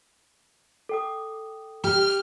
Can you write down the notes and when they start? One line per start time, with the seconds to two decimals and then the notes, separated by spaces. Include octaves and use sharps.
0.89 A4 G5 D#6
1.84 G4 F6